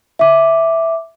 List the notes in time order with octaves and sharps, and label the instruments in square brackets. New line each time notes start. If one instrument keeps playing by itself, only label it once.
[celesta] E5 D6